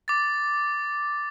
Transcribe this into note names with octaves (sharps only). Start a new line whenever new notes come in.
D6 A6